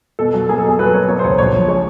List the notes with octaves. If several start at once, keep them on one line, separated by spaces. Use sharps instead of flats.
B2 A4
F#3
A#3 G#4
A4
B2 G#4
F#3 B4
A#3 C#5
A#3 C#5
C5
C#2 C#5
A#1 C#5
F3
G#3 C#5